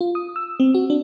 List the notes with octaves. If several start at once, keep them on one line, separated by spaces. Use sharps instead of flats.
F4
D#6
E6
C4
F#4
D4